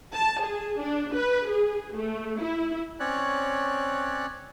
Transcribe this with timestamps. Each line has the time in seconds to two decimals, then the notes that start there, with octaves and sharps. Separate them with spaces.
0.14 A5
0.43 G#4
0.82 D4
1.15 B4
1.50 G#4
1.97 A3
2.42 E4
3.00 C4 C#4 C#5 D5 F#6